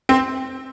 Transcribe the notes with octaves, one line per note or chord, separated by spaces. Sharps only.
C4